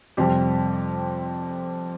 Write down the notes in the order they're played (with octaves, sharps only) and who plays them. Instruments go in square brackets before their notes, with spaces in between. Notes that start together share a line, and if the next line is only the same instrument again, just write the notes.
[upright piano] F2 C3 G3 C4 G4